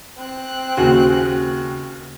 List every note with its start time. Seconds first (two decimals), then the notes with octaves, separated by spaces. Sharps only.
0.17 C4 F#6
0.77 D#2 C#3 F#4